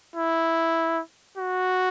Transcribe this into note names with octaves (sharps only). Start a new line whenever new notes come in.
E4
F#4